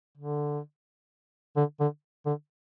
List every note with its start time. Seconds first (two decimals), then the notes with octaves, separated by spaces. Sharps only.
0.18 D3
1.57 D3
1.80 D3
2.26 D3